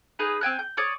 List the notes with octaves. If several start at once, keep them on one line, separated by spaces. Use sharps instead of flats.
D#4 G#4 B4
C4 G5 G#5 F#6
G6
C#5 D5 D#6